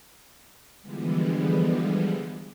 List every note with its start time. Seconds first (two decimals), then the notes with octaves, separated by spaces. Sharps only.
0.82 D3 E3 F3 G3 G#3 B3